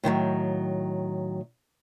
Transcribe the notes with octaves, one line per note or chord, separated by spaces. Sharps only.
A2 D#3 E3 F#3